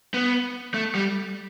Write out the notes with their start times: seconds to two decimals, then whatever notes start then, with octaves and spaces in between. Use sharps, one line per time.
0.14 B3
0.74 A3
0.95 G3